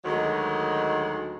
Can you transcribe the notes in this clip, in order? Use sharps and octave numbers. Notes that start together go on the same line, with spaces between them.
D2 D#3 F#3 G#3